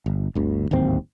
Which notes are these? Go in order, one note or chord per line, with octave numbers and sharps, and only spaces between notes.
G1
G1 D2
D1 G#1 D#2 C4